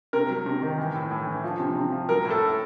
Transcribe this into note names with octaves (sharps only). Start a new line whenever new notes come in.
C3 A#4
F#3
C3
D#3
E3
A2
A2
E3
F3
C3
C3
F3
F#3 A#4
A2
A4
A2